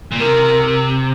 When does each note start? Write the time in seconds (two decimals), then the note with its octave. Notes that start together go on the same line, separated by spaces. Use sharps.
0.11 A#2
0.20 C3 A#4